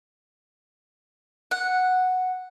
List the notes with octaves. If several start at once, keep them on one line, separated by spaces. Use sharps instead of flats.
F#5